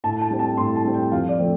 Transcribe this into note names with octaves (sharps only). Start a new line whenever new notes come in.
A2 A5
A5
G3 C4
A5
A2 C6
A5
G3 C4
G5
F2 F5
D5
F3 A3 C4